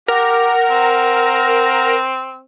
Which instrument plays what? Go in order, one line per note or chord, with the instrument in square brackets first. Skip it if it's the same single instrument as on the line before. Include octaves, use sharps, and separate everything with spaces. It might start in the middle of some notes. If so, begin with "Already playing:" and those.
[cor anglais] G4 [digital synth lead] A#4 [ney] F#5
[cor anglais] C4